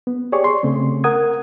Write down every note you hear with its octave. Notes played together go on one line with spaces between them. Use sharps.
B3
G4 G#4 C#5 D5 C#6
C6
C#3 A3 C4
A#4 F#5 D#6 G#6